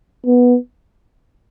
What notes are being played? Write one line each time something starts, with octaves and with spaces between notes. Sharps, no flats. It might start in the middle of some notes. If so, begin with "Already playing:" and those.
B3